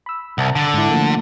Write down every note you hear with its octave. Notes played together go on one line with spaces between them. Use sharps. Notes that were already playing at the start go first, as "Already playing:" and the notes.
B5 E6
C2 F#5 A5 A#5
D3
G#2 E4
F3 A3 A#3